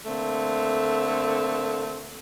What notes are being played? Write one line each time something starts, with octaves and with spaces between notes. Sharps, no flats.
D3 A3 A#3 C4